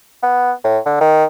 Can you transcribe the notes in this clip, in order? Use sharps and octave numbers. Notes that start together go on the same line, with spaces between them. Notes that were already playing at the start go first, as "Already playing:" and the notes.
B3
A2
D3
D#3